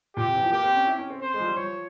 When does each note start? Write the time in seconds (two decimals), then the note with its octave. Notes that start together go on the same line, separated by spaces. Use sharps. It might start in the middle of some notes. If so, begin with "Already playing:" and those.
0.16 A#2 G4
0.26 C3
0.35 E3
0.43 F3
0.52 A#3 G4
0.63 C4
0.75 C#4
0.87 E4
0.99 C#4
1.10 C4
1.22 C5
1.34 G#3
1.40 F3
1.45 G3
1.56 F3 C#5